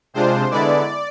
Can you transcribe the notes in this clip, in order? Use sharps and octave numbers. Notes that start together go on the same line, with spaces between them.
C3 G#3 D4 F4 C5
D3 G#3 B3 E4 D5